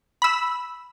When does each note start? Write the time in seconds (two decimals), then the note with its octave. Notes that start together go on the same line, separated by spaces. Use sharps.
0.22 B5 E6